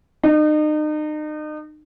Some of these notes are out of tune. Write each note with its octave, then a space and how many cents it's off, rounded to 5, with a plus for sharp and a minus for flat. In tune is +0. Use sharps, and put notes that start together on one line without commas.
D#4 -35